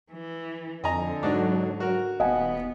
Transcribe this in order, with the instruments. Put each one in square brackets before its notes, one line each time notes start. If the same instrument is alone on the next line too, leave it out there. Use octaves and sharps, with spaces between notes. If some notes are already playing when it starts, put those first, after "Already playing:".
[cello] E3
[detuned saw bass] F2 [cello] D3 [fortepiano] D#5 G#5 A#5
[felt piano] G#2 [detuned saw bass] F#3 [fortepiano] D4 D#4 F#4
[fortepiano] F#4 A#4
[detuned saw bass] D#1 [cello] B3 [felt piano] D#5 F#5 G#5